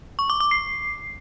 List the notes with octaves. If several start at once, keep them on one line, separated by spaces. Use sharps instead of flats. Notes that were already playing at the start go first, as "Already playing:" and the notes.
C#6
D6
D6
C7